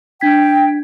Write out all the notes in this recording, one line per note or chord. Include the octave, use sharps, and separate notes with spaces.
D4 G5 G#6 B6